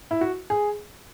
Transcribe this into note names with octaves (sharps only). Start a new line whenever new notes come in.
E4
F#4
G#4